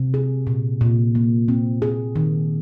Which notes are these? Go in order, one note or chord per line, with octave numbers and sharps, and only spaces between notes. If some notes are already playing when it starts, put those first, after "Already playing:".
Already playing: C3
G#4
A#2
A#2
A#3
C4
G#4
D#3